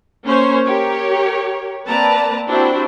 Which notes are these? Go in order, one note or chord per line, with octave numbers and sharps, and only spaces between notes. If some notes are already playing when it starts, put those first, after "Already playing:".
A#3 C#4 C5 C#5
G4 A#4 C#5
A#3 C4 B4 D5 A5 A#5
C4 D4 E4 F#4 G4 C5